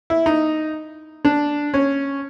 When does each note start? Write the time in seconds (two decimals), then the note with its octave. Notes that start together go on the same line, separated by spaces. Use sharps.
0.10 E4
0.26 D#4
1.25 D4
1.74 C#4